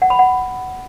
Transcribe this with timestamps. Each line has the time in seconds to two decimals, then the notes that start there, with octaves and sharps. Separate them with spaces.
0.02 F#5
0.10 B5
0.19 F#5